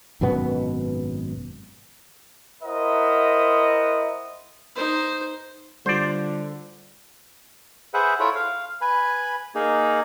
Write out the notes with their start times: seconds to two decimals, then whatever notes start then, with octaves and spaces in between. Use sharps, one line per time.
0.21 G#1 F#2 B2 B3
2.63 E4 A#4 C5 D#5 E5 F#5
4.75 D#4 C5
5.86 D3 G3 F4 C5 D5
7.94 G#4 B4 C5 E5 F#5
8.20 E4 F4 A4 C#5 E5
8.35 F5
8.81 B4 G#5 B5
9.55 A#3 D#4 G#4